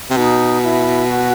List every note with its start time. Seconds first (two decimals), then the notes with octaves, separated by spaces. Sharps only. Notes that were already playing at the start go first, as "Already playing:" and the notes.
0.10 C3
0.17 B2 D#4
0.63 E4
1.09 F#4